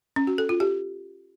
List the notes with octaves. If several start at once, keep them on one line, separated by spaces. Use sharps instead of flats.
C#4
F#4
A4
F4
G4